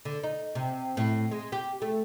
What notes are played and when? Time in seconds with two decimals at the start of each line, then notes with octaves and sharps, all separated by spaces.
0.05 D3
0.23 D#4
0.55 C3
0.97 A2
1.31 G#3
1.52 G4
1.82 A3